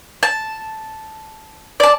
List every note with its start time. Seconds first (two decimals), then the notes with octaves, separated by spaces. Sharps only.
0.23 A5
1.80 D5 A5